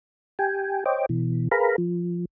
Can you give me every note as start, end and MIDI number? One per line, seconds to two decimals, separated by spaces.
0.39 0.84 67
0.39 0.84 79
0.39 0.84 80
0.86 1.06 72
0.86 1.06 73
0.86 1.06 75
0.86 1.06 79
0.86 1.06 86
1.09 1.49 47
1.09 1.49 52
1.52 1.76 68
1.52 1.76 70
1.52 1.76 71
1.52 1.76 77
1.52 1.76 82
1.52 1.76 83
1.78 2.25 53